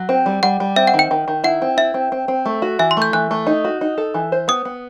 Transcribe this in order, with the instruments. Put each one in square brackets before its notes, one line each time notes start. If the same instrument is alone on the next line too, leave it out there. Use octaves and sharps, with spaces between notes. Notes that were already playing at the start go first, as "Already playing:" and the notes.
Already playing: [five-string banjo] F#3
C4
G3
[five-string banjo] G3 [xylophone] F#5
[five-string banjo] G3
[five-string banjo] C4 [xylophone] E5
[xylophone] F#5
[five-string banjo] D#3
[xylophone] G5
[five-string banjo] D#3
D#3
[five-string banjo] E4 [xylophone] F#5
[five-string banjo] C4
[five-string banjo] E4 [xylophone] E5
[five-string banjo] C4
C4
C4
A3
F#4
[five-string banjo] E3 [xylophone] E5
[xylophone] C6
[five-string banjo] A3 [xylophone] G6
[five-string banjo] E3 [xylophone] F#6
[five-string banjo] A3
D#4
F#4
D#4
A4
E3
C5
[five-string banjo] B3 [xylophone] D#6
[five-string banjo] B3